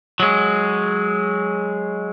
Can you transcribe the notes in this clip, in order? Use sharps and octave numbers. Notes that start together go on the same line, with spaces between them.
F#3 G#3